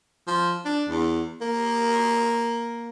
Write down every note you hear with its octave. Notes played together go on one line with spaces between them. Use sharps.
F3
D4
E2
A#3